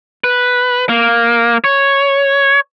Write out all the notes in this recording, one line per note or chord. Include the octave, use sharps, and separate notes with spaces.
B4
A#3
C#5